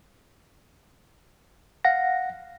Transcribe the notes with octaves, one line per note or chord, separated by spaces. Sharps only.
F5 F#5 A#6